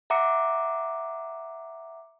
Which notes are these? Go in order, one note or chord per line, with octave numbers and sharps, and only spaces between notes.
E5 F#5 A#5 D6 C#7